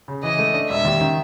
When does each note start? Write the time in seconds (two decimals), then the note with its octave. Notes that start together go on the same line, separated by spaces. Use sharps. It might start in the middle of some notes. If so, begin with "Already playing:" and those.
0.08 C#3
0.23 E3 D#5
0.39 A3
0.54 D4
0.70 E1 E5
0.85 D#2
1.01 D#3